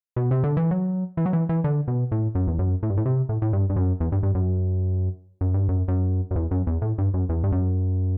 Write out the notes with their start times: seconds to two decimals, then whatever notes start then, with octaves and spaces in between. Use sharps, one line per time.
0.16 B2
0.31 C3
0.44 D3
0.57 E3
0.71 F#3
1.17 E3
1.26 F#3
1.33 E3
1.49 E3
1.64 D3
1.88 B2
2.12 A2
2.35 F#2
2.47 E2
2.59 F#2
2.83 A2
2.90 G2
2.97 A2
3.06 C3
3.29 A2
3.42 A2
3.53 G2
3.70 G2
3.76 F#2
4.00 E2
4.12 G2
4.23 G2
4.35 F#2
5.41 F#2
5.54 G2
5.69 F#2
5.88 F#2
6.31 F#2
6.36 E2
6.51 F#2
6.67 E2
6.82 A2
6.98 G2
7.14 F#2
7.29 E2
7.44 G2
7.52 F#2